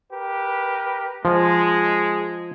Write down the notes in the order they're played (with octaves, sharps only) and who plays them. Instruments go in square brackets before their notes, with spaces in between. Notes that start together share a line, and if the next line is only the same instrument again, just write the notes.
[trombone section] G4 A#4 B4
[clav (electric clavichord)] F3 [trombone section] G#3